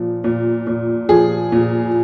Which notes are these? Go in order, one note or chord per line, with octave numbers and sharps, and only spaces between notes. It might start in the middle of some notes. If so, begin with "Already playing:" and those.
Already playing: A#2 F3
A#2
A#2
F3 G#4
A#2